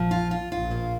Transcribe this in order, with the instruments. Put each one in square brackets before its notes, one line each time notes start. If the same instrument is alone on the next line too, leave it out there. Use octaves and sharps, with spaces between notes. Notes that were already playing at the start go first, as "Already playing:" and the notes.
Already playing: [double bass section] A#1 A#2 [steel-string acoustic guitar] F3
[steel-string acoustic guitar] F4
F4
[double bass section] A#1 A#2 [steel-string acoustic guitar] F4
[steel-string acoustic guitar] A#3